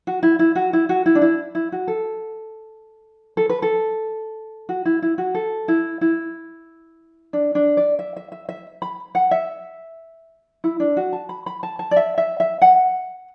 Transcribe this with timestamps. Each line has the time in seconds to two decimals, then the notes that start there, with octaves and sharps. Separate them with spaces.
0.07 F#4
0.23 E4
0.39 E4
0.55 F#4
0.73 E4
0.89 F#4
1.06 E4
1.15 D4
1.22 E4
1.55 E4
1.72 F#4
1.88 A4
3.37 A4
3.49 B4
3.62 A4
4.69 F#4
4.85 E4
5.02 E4
5.18 F#4
5.34 A4
5.68 E4
6.01 E4
7.33 D4
7.55 D4
7.77 D5
7.99 E5
8.16 E5
8.32 E5
8.49 E5
8.82 B5
9.15 F#5
9.31 E5
10.64 E4
10.80 D4
10.97 F#4
11.13 A5
11.29 B5
11.46 B5
11.63 A5
11.79 A5
11.91 D5
11.96 E5
12.18 E5
12.40 E5
12.61 F#5